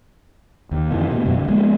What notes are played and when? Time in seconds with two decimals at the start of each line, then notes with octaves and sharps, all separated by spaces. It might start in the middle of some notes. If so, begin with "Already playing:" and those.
0.71 D#2
0.91 F2 C3 D#3 E3
1.10 A2 C3
1.25 F2 B2 F#3 G3
1.37 D2 C#3
1.48 F3 G#3 A#3 B3